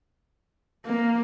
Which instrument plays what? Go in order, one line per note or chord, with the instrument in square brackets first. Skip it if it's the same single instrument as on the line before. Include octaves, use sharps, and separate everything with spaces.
[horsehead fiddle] A#3